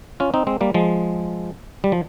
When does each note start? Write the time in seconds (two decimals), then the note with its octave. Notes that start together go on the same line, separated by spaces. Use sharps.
0.20 C#4 F4
0.34 C4 D#4
0.47 G#3 C4
0.61 G3 A#3
0.74 F3 G#3
1.84 G3
1.92 F3